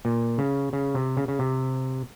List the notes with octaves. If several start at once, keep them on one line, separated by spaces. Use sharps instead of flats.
A#2
C#3
C#3
C3
C#3
C#3
C3